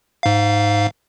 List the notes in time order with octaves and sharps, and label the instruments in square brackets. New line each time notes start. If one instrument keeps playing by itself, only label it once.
[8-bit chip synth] G#2 F5